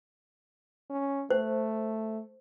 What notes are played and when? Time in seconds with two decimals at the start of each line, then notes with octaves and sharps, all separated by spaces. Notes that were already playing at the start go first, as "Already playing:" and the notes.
0.90 C#4
1.30 A3 C5